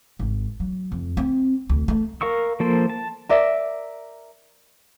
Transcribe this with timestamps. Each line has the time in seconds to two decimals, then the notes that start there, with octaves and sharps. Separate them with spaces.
0.19 G#1
0.60 F#3
0.92 F2
1.17 C4
1.69 D2
1.88 A3
2.21 A#4 F5 C#6 E6
2.60 F3 A#3 A4 C5
2.90 A5
3.29 A#4 D5 E5